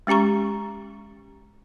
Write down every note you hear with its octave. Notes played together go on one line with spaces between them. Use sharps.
G#3 C#4 G4 A#5 C#6